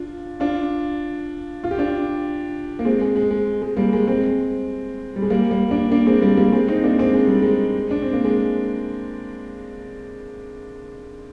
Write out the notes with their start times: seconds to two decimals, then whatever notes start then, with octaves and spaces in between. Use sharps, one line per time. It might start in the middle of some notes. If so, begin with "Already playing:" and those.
Already playing: D4 F4
0.40 D4 F4
1.64 F4
1.71 G4
1.78 D4 F4
2.79 A#3
2.85 G#3 C4
3.01 G#3
3.16 G#3
3.31 G#3
3.62 G#3
3.77 G3 A#3
3.93 G#3
4.07 G#3 C4
5.16 G3
5.22 G#3
5.30 G3 A#3
5.51 G3 A#3
5.71 A#3 D4
5.92 A#3 D4
6.06 G#3 C4
6.22 G3 A#3
6.37 G3 A#3
6.52 G#3 C4
6.68 C4 D#4
6.83 A#3 D4
6.98 G#3 C4
7.14 G#3
7.27 G3
7.42 G#3
7.91 D4
8.02 C4
8.13 A#3
8.25 G#3